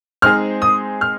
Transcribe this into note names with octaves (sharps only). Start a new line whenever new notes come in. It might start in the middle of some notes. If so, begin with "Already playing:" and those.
G#3 C4 D#4 G#4 C5 F6
D#6
F6